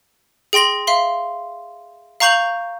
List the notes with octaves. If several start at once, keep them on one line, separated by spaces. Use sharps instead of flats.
G#4 G5 C6 A#6 F#7
E5 F5 C6
F5 A#5 C#6 G6 F7 F#7